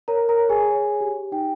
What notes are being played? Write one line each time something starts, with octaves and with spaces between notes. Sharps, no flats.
A#4 C#5 A#5
A#4 A#5
C#5
G#4 G#5
C#5
G4
D#4 G5